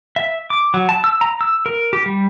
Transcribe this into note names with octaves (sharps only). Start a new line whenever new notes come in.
E5
D6
F#3
A5
E6
A#5
E6
A#4
G4
G3